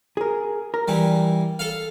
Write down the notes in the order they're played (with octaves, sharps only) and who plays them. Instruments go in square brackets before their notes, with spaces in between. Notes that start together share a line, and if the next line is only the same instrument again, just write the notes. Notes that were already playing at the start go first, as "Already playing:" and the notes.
[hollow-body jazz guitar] G#4 A#4
A#4
[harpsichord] E3 G3
A4 F5